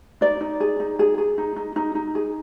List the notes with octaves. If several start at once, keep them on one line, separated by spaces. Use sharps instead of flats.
D#4 D5
D#4
G#4
D#4
G#4
G#4
D#4
D#4
D#4
D#4
G#4